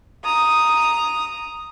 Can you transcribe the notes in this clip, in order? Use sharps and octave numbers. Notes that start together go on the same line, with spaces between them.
A#5 D#6